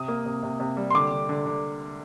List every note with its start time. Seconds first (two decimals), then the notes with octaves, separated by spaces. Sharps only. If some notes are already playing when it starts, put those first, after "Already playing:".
Already playing: C3 D#6
0.08 A#3
0.25 C3
0.43 C3
0.60 C3
0.77 G3
0.91 C6
0.94 D3 D6
1.11 D3
1.29 D3
1.46 D3